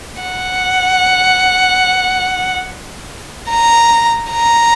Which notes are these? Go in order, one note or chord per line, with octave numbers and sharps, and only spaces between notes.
F#5
A#5
A#5